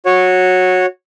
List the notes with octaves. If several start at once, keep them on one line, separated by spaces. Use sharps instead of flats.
F#4 C#5